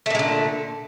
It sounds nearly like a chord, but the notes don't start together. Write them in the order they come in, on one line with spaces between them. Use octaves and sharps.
A3 A#2 G#3 D3